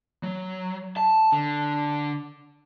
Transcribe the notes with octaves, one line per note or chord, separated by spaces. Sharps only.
F#3
A5
D3